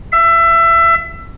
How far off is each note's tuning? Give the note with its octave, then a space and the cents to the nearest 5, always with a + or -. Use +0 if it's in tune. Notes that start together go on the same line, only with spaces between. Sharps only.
E5 +25